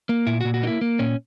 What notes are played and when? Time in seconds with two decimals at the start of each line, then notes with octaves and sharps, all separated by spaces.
0.09 A#3
0.27 A#2 E4
0.40 A#2 F#4
0.54 F#4
0.63 A#3 D#4
0.67 E4
0.81 A#3
0.99 A#2 C#4